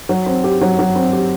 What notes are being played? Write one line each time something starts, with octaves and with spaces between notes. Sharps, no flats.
F#3
C4
G4
F#3
F#3
C4
G4